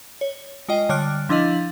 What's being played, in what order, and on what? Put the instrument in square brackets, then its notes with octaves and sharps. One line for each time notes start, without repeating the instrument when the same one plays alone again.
[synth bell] C#5
G#3 F4 D#5 G5
D3 G3 C#5 F6 F#6 D7
F3 D4 E4 D#5 F5 F#7